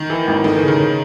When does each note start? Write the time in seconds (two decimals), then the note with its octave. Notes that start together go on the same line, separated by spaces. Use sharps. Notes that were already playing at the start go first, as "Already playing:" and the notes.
Already playing: D#3
0.10 E3
0.27 G#1
0.44 D#3 A3
0.56 E3
0.63 C#3
0.68 D#3
0.80 C#3